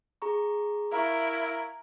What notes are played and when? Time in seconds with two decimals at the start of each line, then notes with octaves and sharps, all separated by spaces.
0.22 G#4 A#5 C#6
0.92 E4 A#4 F5 C#6